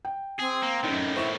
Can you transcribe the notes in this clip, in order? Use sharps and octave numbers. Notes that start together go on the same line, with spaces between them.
G5
C4 G#4
A#3
F#2 A2 D#3 D#4
E4 C5 C#6 E7